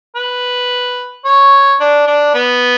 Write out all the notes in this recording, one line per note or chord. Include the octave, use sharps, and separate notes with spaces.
B4
C#5
D4
D4
B3